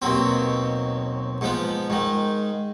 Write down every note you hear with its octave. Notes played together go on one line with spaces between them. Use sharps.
D#2 B2 F#3 C4
G#2 F3 B3
G#2 D#3